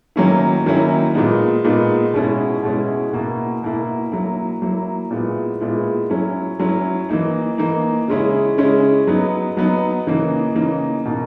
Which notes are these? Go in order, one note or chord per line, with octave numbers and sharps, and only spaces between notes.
D#3 F#3 A#3 C#4 E4
D#3 F#3 A#3 C#4 E4
A#2 G#3 B3 D#4
A#2 G#3 B3 D#4
B2 G#3 C#4 E4
B2 G#3 C#4 E4
B2 A#3 E4
B2 A#3 E4
F#3 A#3 E4
F#3 A#3 E4
A#2 G#3 B3 E4
A#2 G#3 B3 E4
F#3 C#4 E4
F#3 C#4 E4
E3 A#3 D#4
E3 A#3 D#4
C#3 G#3 C#4 E4
C#3 G#3 C#4 E4
F#3 B3 D#4
F#3 B3 D#4
C#3 E3 A#3 D#4
C#3 E3 A#3 D#4
B2 A#3 D#4